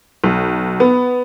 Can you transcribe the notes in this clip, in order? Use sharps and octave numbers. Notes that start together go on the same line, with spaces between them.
B1
B3